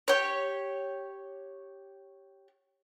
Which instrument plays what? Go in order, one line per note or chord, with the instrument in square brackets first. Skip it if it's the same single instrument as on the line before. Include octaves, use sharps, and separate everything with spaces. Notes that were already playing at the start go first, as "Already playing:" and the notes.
[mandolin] G4 C#5